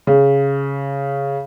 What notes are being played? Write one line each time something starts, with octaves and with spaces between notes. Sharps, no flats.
C#3